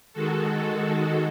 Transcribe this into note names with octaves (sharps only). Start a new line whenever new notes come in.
D#3 G#3 F#4 A4